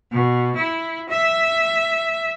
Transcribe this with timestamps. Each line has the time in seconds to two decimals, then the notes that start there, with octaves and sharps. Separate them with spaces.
0.11 B2
0.56 E4
1.10 E5